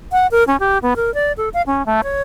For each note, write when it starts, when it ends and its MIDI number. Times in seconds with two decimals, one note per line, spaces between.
0.12 0.27 78
0.31 0.44 70
0.47 0.57 61
0.60 0.78 67
0.82 0.94 59
0.96 1.13 70
1.14 1.32 74
1.37 1.49 69
1.54 1.62 77
1.67 1.85 61
1.86 2.01 57
2.03 2.22 73